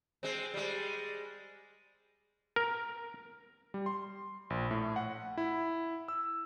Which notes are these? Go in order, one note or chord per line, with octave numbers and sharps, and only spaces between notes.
G#3 C4
G3 G#3
A#4
G3
C6
A#1
A2
F#5
E4
E6